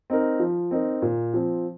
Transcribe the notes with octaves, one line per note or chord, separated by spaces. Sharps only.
C4 D#4 A#4
F3
C4 D#4 A#4
A#2
F3 C4